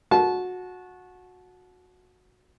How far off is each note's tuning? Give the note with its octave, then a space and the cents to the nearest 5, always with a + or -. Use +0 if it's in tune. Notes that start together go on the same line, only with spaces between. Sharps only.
F#4 -20 A5 -25